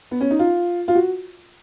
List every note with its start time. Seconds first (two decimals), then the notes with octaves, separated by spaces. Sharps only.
0.11 B3
0.21 C#4
0.31 D#4
0.39 F4
0.88 F4
0.95 F#4